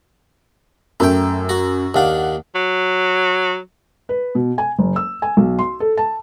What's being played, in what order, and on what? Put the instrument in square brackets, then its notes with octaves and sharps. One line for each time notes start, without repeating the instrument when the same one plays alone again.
[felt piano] F#2 [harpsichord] A3 G5
[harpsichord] F#4
[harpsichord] D#2 D4 [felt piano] F5 F#5
[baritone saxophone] F#3
[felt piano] B4
B2
G#5
F#1
E6
G#5
B1
C6
A4
A5